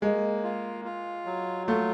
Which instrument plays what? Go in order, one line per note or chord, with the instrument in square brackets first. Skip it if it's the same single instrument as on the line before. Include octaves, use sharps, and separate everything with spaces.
[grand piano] G#3 [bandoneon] A#3
[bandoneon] F4
F4
F#3
[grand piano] A3 [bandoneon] F4